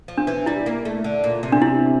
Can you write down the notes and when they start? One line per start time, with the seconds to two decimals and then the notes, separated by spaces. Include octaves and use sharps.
0.08 F3
0.18 D4
0.27 E3
0.46 G3 E4
0.66 A#3
0.85 A3
1.04 D3
1.24 A#2
1.43 C3
1.52 D4
1.62 E4